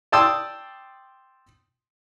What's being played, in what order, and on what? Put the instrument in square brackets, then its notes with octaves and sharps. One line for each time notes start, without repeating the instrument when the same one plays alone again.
[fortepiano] D5 G5 A5 C6 D#6 E6